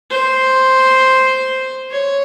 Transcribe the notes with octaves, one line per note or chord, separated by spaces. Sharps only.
C5
C#5